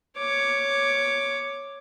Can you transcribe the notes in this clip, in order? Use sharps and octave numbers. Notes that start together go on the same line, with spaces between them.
C#5 D6